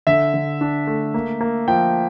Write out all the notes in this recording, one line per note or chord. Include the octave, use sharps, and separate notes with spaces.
D3 E5
D3
D4
A3
A#3
A#3
F3 G5